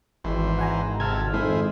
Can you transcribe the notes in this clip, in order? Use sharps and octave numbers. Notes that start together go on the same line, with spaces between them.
G#1 E3 C5
F#5 G#5 A#5
C3 A4 A5 F6 G#6
F2 G#2 D#3 E4 G#4 C5